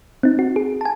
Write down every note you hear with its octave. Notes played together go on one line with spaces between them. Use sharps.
C4 D#4
F#4
G#4
G#5 A5